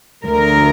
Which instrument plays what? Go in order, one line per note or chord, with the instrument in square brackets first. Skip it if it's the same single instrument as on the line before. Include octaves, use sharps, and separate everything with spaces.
[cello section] D2 D3 A#4